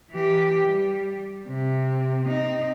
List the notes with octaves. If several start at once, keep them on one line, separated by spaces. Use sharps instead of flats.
E3 G4
G3
C3
C4 D#4